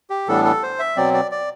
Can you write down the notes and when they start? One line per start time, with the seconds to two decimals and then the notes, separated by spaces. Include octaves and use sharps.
0.10 G4
0.28 A2 E3 G3 B3 D4 A4
0.45 A4
0.63 C5
0.79 E5
0.97 B2 F#3 C4 D5
1.14 D5
1.31 D5